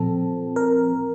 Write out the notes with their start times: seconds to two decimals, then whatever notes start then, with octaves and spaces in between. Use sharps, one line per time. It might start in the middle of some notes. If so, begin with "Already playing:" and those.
Already playing: A#2 F3 C4 A4
0.56 A#4